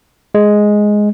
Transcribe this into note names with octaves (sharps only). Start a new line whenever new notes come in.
G#3